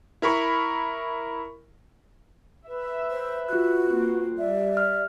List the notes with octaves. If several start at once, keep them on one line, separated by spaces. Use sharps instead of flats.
E4 A#4 B5 C#6
B4 E5
C5
F4 F#4 F#6
A#3 C4
G3 D5 E5
F6